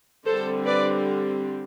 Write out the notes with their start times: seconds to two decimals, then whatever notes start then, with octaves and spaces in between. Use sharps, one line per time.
0.26 D3 G3 C4 A4 C5
0.66 B4 D5